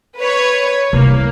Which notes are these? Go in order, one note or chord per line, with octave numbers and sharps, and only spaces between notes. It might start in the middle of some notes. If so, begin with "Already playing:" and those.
B4 C#5
C2 A#3